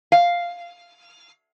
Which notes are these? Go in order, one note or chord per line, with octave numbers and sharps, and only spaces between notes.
F5